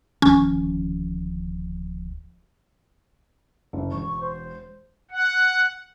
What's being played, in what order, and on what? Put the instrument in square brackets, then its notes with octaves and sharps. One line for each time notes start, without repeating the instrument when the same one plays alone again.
[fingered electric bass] D1 D#3 F3 [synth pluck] C#4
[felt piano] F#1
[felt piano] E1 [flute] C#6
[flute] C5
[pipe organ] F#5